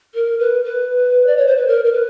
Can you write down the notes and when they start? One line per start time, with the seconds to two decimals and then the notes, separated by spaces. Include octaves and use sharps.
0.14 A#4
0.39 B4
0.64 B4
1.26 D5
1.37 C#5
1.46 C5
1.57 B4
1.67 A#4
1.84 A#4
1.92 B4